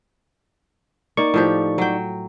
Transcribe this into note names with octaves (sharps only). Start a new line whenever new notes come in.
A#3 D#4 D5 C#6
A2 F3 G4
F#3 G5